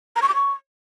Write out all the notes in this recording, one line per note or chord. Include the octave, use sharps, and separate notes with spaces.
A#5
C#6
D6
C#6